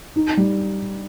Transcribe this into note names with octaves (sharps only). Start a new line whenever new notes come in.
D#4
G3